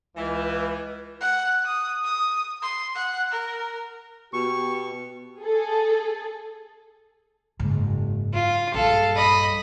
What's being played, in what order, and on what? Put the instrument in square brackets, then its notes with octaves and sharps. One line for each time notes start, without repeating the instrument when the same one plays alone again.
[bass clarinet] C#2 [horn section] E3
[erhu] F#5
D#6
D#6
C6
F#5
A#4
[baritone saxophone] B2 [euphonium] G4 [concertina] C#6
[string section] G#4 A4
[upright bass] F#1 G#2
[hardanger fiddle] F4
[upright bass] A#1 G2 [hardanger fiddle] A4 F5
[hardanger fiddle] D#5 B5